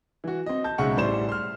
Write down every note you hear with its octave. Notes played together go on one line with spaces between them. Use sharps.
E3 F#4
C4 D#5
A5 G6
B1 C#3 G#3 E5 F#5 C#6
A1 G3 E4 C5 D5 E7
C6 F6